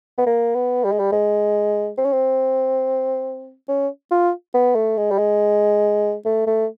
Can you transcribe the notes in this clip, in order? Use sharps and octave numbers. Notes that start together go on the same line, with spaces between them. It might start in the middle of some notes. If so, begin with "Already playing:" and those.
B3
A#3
B3
G3
G#3
G3
G#3
C4
C#4
C4
C#4
F4
B3
A3
G#3
G3
G#3
A3
A3